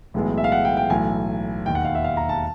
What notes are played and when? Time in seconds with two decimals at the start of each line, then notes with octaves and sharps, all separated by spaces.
0.14 B1 A2 E3 G#3 B3
0.38 E5
0.44 F5
0.52 F#5
0.65 G5
0.77 G5
0.90 B1 A2 E3 A3 G#5
1.66 E1 D#2 D#3 G5
1.75 F#5
1.85 F5
1.95 E5
2.04 F5
2.17 A#5
2.29 A5